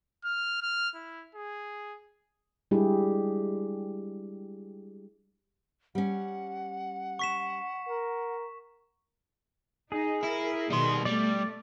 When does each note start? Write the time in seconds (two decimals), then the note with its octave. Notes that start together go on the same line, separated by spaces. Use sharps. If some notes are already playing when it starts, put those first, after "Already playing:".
0.25 F6
0.62 F6
0.95 E4
1.35 G#4
2.71 G3 G#3 D4 E4 G4 G#4
5.95 G3 C#4 F#5
7.19 C#6 B6 E7
7.88 A#4
9.92 D#4 G#4
10.24 E4 A#4
10.70 B2 D#3 G3 C6
11.05 G3 A3 D5